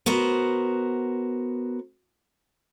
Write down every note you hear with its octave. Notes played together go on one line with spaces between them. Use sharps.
B3 F#4 A#4 C5